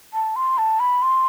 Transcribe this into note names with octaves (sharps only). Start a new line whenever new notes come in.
A5
C6
A5
B5
C6